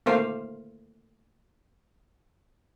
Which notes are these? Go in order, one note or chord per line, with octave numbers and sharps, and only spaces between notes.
A3 A#3 C5 F5